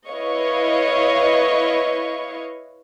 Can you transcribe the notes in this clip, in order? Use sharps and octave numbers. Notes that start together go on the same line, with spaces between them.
E4 B4 C#5 D#5 F5 C#6